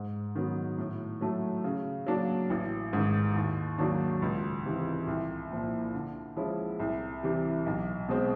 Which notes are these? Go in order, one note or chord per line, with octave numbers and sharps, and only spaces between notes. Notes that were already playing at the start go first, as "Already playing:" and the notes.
Already playing: G#2
D#3 F#3 B3
A2
F#3 A3
C#3
F#3 A#3 D4
A1
G#2 D#3
D#2
D#3 F#3 A#3 D4
C#2
C3 E3
C2
A#2 F3 A#3
D3
F3 G#3 C#4 E4
C2
C3 E3 G3
B1
B2 G#3 C4